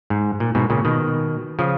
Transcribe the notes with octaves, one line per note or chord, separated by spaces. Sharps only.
G#2
A#2
G#2 B2
A#2 C#3
B2 D#3
C#3 F3